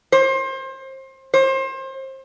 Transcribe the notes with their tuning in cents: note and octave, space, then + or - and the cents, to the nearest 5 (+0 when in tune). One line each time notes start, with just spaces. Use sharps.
C5 +30
C5 +30